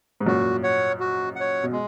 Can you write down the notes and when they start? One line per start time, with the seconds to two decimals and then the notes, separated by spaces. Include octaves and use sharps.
0.20 G#2
0.26 F#2 A#2 F#4
0.63 C#5 F#5
1.00 F#4
1.36 C#5 F#5
1.63 B2
1.72 G#3